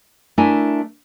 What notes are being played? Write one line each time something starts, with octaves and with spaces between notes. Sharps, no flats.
A3 D4 E4 A#4 G#5